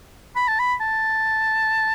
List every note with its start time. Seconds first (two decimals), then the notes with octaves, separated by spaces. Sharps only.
0.36 B5
0.48 A5
0.59 B5
0.81 A5